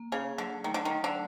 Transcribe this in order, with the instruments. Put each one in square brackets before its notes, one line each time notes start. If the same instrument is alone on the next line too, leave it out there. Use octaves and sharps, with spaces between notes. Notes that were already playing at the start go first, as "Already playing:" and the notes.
Already playing: [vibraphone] A#3
[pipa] C#3 [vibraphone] G#4
[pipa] D3 [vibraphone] F#3
[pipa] D#3 [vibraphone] A3
[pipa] D3
D#3
[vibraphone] F#3
[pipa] D3